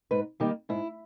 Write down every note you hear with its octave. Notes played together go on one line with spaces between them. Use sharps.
G#2 B4
D#3 G3 A#3 D#4 G4
G#2 E4